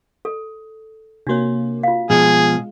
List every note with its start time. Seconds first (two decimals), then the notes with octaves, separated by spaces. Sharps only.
0.25 A4
1.27 C3 A#3 D4 F#4 C#5
1.83 F4 F5
2.10 B2 F3 G#3 G#4